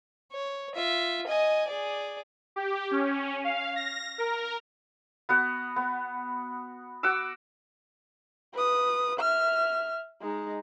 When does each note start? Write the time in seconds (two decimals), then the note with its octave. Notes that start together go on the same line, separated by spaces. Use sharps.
0.32 C#5
0.75 F4 E5
1.27 D#5 G#5
1.68 G#4 D5
2.56 G4
2.91 C#4
3.44 F5
3.76 A#6
4.18 A#4
5.29 B3 F#4 F#5
5.76 B3
7.03 F#4 F#5 D6 E6
8.54 B4 D#6
9.20 E5 F6
10.22 G#3 D#4